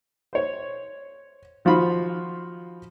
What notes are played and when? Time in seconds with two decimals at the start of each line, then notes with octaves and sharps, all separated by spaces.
0.33 C5 C#5
1.65 D#3 F3 F4 F#4 B5